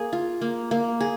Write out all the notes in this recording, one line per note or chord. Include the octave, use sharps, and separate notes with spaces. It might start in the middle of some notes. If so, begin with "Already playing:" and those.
Already playing: A#3 G#4
F4
A#3
A#3
G#4